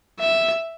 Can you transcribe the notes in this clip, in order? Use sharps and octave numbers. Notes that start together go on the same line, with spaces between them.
E5